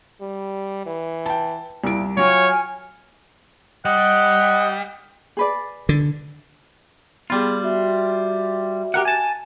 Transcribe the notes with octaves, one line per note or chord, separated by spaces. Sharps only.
G3
E3
G5 A5
C2 A#2 E4 D7
F#3 F4 C#5 G5 G#5 F6
G3 D#5 F#5
G#4 B4 D5
D3
G3 B3 F4 G#4
F#4 E5
G4 A#4 F#5
G#5 A5